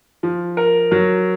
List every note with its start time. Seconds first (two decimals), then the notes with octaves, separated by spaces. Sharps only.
0.23 F3
0.57 A#4
0.91 F#3